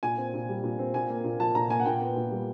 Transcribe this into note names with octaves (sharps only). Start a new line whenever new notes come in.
A#2 G#5
C4
A#2
G3
A#2
C4
A#2 G#5
A#3
A#2
F3 A5
A#2 A#5
A#3 G#5
F#5
A#2 G5
B3
A#2
G3